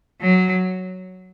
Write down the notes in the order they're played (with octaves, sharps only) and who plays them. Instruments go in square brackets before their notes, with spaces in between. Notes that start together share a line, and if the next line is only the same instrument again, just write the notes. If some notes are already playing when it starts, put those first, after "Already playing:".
[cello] F#3